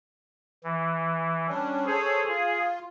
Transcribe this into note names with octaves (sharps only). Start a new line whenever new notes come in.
E3
G3 C#4 D4
G#4 A4 C5 C#5
F4